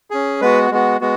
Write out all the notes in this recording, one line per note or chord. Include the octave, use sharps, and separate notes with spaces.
C#4 G#4
G#3 B3 F#4 B4
G#3 B3 F#4
G#3 B3 F#4